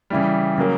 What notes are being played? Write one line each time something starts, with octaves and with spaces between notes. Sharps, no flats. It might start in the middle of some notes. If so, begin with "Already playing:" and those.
C#3 E3 G3
C#3 F#3 A#3